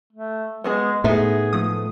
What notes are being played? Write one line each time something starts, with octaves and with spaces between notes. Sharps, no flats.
A3
G#3 B3 F#4 G#4
A2 B3 D#4 G#4 E5
F3 A3 D#6